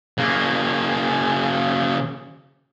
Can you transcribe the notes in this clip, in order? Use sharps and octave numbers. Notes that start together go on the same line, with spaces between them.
C#3 A#3